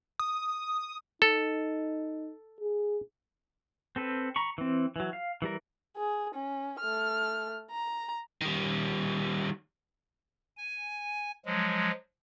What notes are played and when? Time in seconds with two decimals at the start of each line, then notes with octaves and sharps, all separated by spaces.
0.19 D#6
1.22 D#4 A4
2.61 G#4
3.96 C4 A4 B4
4.36 A#5 B5 C#6
4.58 E3 C4
4.96 E3 F#3
5.13 F5
5.42 E3 G3 A#4
5.97 G#4
6.35 C#4
6.80 A3 F6
7.71 A#5
8.41 D#3 G3
10.57 G#5
11.46 F3 F#3 G#3